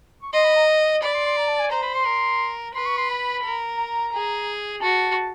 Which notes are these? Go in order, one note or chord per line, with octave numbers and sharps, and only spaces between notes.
C#6
D#5 C6
B5
A#5
D5 B5
C6
C6
A#5
A5
G#5
C5 A#5
B5
C6
A#4
B4 C6
C#6
C6
B5
A#4
A#5
G#4
F#4 A5